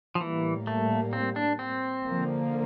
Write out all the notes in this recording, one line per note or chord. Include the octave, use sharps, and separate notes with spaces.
F3
A2 E3 G3 A#3
A3
C4
D4
C4
D3 F3 A#3